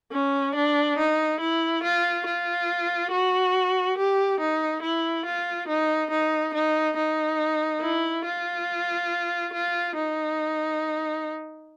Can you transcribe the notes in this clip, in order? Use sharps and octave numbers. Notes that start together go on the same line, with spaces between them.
C#4
D4
D#4
E4
F4
F4
F#4
G4
D#4
E4
F4
D#4
D#4
D#4
D#4
E4
F4
F4
D#4